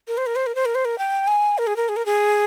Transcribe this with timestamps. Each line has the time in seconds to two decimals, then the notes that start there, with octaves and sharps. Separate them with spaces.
0.08 A#4
0.17 C5
0.26 A#4
0.36 C5
0.46 A#4
0.55 C5
0.65 A#4
0.75 C5
0.85 A#4
0.98 G5
1.27 G#5
1.58 A#4
1.67 G#4
1.76 A#4
1.89 G#4
1.96 A#4
2.06 G#4